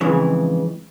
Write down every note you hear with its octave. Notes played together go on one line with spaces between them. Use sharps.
F2 G#2 C#3 E3